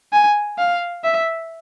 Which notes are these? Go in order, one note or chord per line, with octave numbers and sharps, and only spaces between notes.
G#5
F5
E5